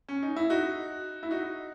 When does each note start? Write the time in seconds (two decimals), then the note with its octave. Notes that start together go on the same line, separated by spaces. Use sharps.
0.09 C#4
0.23 D#4
0.36 E4
0.50 D#4 F#4
1.23 E4
1.31 D#4 F#4